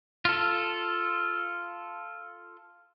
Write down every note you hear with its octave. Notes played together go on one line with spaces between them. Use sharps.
F4 A4